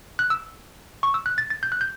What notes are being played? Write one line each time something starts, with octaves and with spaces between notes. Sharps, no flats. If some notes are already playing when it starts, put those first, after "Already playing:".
F#6
E6
C#6
E6
F#6
A6
A6
G6
F#6
G6